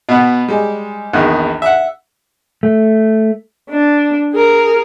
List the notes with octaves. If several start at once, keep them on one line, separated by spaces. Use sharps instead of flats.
B2 B3
G3 G#3
A#1 E2 D#3
E5 F#5
A3
D4
G#4 A#4